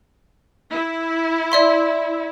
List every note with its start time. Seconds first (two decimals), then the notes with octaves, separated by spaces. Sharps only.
0.69 E4
1.52 D5 E5 C6